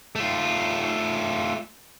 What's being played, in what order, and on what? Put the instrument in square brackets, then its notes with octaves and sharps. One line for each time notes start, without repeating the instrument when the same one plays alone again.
[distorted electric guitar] A3 F4